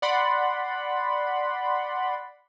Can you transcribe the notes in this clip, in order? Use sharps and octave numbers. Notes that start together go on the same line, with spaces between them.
D5 F#5 B5 C6